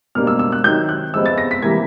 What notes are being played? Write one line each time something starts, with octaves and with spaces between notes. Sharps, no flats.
B2 G3 A#3 D4 F6
E6
E6
F#6
C3 D#3 F#3 G6
F#6
C3 F3 G#3 B3 E6
A6
A#6
B6
C3 E3 G3 A#3 G#6